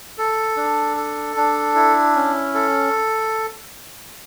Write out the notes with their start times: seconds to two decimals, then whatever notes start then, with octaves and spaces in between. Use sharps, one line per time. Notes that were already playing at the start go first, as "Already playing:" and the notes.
0.18 A4
0.57 D4
0.97 A4
1.36 D4
1.75 E4
2.15 C#4
2.54 A4